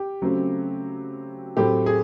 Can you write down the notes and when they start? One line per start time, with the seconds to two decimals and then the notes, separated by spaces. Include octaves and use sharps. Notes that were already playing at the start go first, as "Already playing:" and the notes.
Already playing: G4
0.22 C#3 F#3 A3 C4
1.57 A2 F#3 A3 C4 G4
1.86 G#4